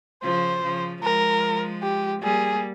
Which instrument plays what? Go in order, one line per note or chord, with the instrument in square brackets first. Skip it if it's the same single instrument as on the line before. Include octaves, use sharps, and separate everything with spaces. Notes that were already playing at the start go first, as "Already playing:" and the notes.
[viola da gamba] C#3 F3 [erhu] C5
[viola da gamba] C#3 F3
[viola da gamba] F3 G#3 [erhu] A#4
[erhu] G4
[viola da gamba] G3 A#3 [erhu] G#4